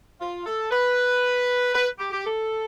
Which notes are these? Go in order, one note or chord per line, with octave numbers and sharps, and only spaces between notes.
F4
A4
B4
B4
G4
G4
A4